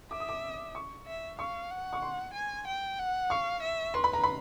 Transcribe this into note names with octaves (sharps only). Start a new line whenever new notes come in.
E5 D6
D#6
D6
C#6
E5
F5 C#6
F#5
C#6
C6
G#5
G5
F#5
F5 C#6
E5
B4 C6
B5
A#5
B5